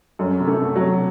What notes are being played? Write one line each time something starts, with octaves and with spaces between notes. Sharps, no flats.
F#2 A3
C3
A3
B2
F#3
C3